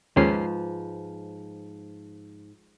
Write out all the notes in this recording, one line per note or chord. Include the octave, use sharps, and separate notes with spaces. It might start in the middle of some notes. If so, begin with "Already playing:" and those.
D#2 G#2 F3 C#4 B4 C7